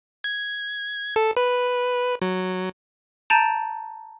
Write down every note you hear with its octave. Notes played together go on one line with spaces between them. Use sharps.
G#6
A4
B4
F#3
A5 A#5 G6 A6 D7 D#7